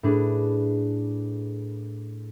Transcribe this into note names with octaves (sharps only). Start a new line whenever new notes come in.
A2 D4 G#4 B4 D6